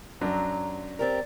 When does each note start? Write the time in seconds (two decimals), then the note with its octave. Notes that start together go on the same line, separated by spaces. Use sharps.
0.21 F#2 F#3 D4 A#5
0.99 C4 G4 A#4 D5